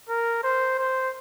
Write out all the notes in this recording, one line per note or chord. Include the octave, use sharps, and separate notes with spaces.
A#4
C5
C5